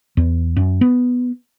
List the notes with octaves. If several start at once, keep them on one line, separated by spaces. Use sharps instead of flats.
E2
F#2
B3